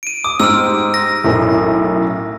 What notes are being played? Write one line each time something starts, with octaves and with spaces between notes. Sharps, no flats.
D7 D#7
D6 D#6
G#2 G4 E6 F6 D7
A#6
B1 F#2 A2